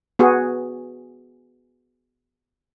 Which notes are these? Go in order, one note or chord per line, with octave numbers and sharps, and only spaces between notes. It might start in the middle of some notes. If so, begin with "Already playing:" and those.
B3 F#4 G#4